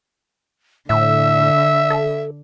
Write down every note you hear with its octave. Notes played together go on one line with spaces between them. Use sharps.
A2 D3 E5 E6
A4